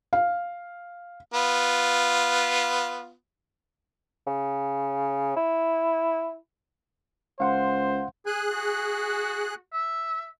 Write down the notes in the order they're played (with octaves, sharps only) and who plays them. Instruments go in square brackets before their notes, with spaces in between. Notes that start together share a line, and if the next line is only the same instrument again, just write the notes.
[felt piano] F5
[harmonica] B3 F4
[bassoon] C#3
E4
[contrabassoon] C#2 [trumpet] C5 [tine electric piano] F5 F#5 C6
[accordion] G#4 F#6 [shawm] G#5
[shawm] F#4
E5